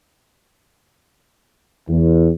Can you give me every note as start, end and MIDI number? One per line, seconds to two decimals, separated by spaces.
1.89 2.31 40